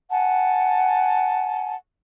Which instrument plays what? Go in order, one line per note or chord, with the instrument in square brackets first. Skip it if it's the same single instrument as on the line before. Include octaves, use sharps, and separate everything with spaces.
[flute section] F#5 G#5 A5